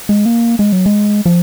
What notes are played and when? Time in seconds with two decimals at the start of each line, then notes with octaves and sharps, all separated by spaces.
0.09 G#3
0.26 A#3
0.59 G#3
0.72 F#3
0.86 G#3
1.26 F3